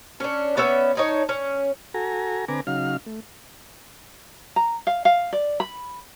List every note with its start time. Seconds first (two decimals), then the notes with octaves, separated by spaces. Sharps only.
0.20 C#4 D4
0.57 B3 C#4 D5 E5
0.95 D4 D#4 C#5
1.29 C#4
1.94 F#4 A4 G#5 A#5
2.48 D3 C4 B4 G#5 A#5 D6
2.67 C#3 F#3 D#4 F5 F6
3.06 A3
4.56 A#5
4.87 F5
5.05 F5
5.33 D5
5.60 B5